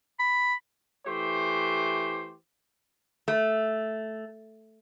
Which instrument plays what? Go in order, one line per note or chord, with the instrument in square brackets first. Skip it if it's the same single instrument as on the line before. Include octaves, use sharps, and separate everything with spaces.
[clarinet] B5
[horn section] E3 A3 G4 C5
[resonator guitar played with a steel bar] A3